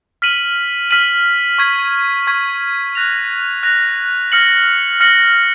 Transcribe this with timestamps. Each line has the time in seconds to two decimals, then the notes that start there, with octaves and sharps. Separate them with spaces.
0.22 F6 B6 D#7 F#7
0.91 F6 B6 D#7 F#7
1.58 C#6 G#6 B6
2.27 C#6 G#6 B6
2.95 F#6 A#6 F7
3.63 F#6 A#6 F7
4.32 F6 A#6 C#7 F#7
5.00 F6 A#6 C#7 F#7